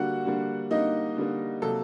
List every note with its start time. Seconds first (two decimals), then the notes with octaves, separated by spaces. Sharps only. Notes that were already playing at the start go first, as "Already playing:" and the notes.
Already playing: D3 G3 A#3 F#4 F#5
0.25 D3 G3 A#3
0.71 D3 G3 A#3 D#4 D#5
1.17 D3 G3 A#3
1.62 C3 F#3 A#3 A4